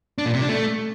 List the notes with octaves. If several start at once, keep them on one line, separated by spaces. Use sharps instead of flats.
D4
A#2
C3
D4
A3